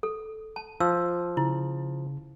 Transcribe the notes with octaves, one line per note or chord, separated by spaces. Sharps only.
A4
A5
F3 E6
C#3 E4